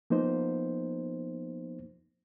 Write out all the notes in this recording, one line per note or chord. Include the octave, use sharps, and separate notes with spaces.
F3 A#3 B3 D#4 C5